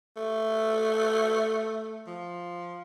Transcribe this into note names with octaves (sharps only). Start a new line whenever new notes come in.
A3
F3